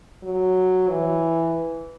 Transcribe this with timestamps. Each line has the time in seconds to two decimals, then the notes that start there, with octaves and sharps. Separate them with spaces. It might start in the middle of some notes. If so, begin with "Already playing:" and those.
0.24 F#3
0.90 E3